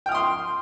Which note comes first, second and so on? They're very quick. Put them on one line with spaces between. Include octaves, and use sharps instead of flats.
G5 F6 D#6 C6